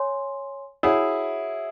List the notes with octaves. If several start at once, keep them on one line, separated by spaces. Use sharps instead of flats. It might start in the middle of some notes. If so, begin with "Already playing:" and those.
Already playing: C#5 G#5 C6
E4 F#4 G#4 C#5 F#5